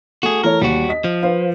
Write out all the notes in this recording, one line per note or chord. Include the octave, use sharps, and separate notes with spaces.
A3 F#4 G#4
E3 A3 A#4 C#5
D#2 G3 F#4
D#5 B6
F3
B4 C5 F5